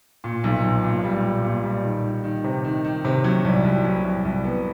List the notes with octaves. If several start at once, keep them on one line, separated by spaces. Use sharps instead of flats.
A#2
B1
B1
A#2
G3
G3
A#2
G3
D#3
D#3
D#3
C3
D#3
D#3
C3
F#3
C2
C2
F#3
C2
C2
B3